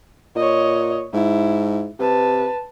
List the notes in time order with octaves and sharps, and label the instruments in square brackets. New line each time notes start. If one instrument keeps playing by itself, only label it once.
[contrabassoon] A#2 [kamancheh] C#5 D#5
[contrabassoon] G#2 [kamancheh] E4
[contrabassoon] C3 [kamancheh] B4 A5